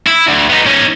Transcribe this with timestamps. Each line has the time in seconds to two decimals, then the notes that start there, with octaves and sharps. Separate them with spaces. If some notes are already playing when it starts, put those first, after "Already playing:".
0.07 E4
0.28 D2
0.50 B3 D#4
0.66 C#4 D#4